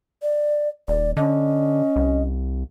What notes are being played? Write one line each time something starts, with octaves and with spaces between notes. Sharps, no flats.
D5
D#1 D5
D3 C#4 D#5
C2